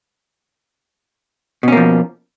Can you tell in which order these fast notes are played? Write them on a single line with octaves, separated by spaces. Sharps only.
B2 C#4 A#3 F3